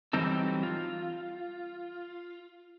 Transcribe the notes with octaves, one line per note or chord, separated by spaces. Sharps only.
E3 F#3 G3 C4 D#4 A4
F4